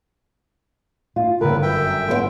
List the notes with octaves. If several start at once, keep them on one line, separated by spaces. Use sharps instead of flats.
F4
G1 E2 A2 D3 A#4 B4
F#2 E5 G5
B3 C5 F#5 C6 G6 D7